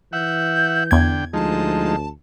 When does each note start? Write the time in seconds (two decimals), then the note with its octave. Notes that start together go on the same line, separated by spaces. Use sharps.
0.13 E3 E5 F#5 G6
0.91 E2 D3 G5 G#6
1.33 D2 F3 G#3 D#4 A5